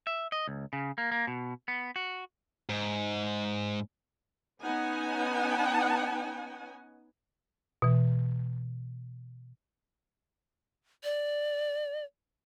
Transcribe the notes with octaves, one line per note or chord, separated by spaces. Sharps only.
E5
D#5
C#2
C#3
A#3
A#3
B2
B3
F#4
G#2
B3 C#4 D#4 F#5 G#5
B2 E3
D5